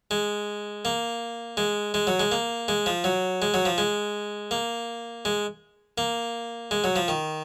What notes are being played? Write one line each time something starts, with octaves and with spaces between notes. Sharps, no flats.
G#3
A#3
G#3
G#3
F#3
G#3
A#3
G#3
F3
F#3
G#3
F#3
F3
G#3
A#3
G#3
A#3
G#3
F#3
F3
D#3